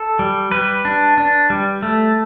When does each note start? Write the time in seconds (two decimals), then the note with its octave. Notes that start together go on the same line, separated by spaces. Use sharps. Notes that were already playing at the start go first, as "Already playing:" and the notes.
Already playing: A4
0.19 G3
0.51 G3 B4
0.85 D4
1.18 D4
1.50 G3
1.82 A3